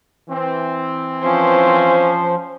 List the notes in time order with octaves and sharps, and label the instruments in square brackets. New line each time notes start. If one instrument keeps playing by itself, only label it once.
[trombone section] E3 C4
[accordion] F3 [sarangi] C#4 [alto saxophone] C5